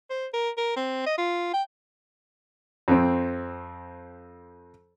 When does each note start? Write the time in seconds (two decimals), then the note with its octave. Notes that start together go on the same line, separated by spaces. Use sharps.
0.10 C5
0.33 A#4
0.57 A#4
0.76 C4
1.06 D#5
1.18 F4
1.53 G5
2.88 F2 C4